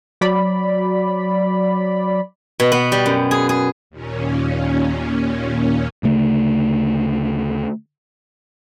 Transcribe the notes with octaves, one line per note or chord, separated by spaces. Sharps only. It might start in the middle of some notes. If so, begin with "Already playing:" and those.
F#3 D5 B5
B2
B3
G3
F#2
G#4
G#4
D#2 A#2 C#4
D2 C#3 A3